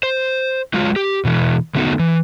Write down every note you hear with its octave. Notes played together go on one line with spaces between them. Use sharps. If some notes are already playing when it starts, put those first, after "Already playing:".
C5
F#3 G#3 F4
G4
B2 E3
D3 F#3 A3 B3 D#4 F#4
E3